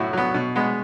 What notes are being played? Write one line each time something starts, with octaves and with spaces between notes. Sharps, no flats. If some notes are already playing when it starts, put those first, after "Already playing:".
Already playing: A2 F#3 B3 E4 F#4
F#3 B3
B2
G#3 B3